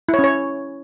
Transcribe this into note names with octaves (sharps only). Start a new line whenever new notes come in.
E4
C#5
C#4
C#5